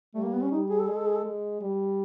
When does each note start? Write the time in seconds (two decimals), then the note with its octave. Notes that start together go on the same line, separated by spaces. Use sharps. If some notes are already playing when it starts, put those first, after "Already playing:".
0.15 G3 A3
0.24 A#3
0.33 B3
0.42 C#4
0.52 G3 D#4
0.70 G#4
0.80 A4
0.88 G#3 G#4
0.97 A4
1.07 G#4
1.16 A4
1.25 G#3
1.61 G3